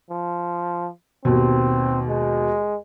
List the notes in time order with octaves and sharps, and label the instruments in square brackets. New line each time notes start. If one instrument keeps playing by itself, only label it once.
[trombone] F3
[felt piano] D#2 B2 [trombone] C4
[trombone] G#3